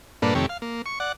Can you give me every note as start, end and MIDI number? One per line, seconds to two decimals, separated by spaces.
0.22 0.34 43
0.22 0.34 46
0.22 0.34 58
0.22 0.34 62
0.22 0.34 69
0.22 0.34 71
0.35 0.46 41
0.35 0.46 48
0.35 0.46 51
0.35 0.46 57
0.35 0.46 67
0.35 0.46 73
0.49 0.58 77
0.62 0.82 58
0.86 0.99 85
1.00 1.12 74
1.00 1.12 78